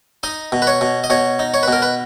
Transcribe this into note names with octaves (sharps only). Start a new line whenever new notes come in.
D#4 D#5
B2
B4
C#5
B2
D#5
B2 C#5
D#4
C#5
B4
B2 A#4
B4